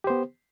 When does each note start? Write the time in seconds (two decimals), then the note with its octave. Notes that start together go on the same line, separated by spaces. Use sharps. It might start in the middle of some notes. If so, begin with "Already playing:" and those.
0.04 G4
0.07 C5
0.10 B3